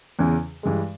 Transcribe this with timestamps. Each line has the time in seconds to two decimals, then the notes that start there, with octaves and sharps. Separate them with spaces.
0.19 E2 C#3 E3
0.63 G2 E3 G#3